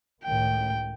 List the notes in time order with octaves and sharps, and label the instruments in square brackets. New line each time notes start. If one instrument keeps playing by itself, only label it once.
[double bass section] C#2 A2 D#3 [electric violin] G5